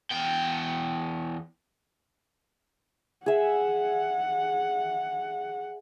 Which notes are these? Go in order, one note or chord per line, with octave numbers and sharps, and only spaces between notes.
E2 G5
G#4 E5 F#5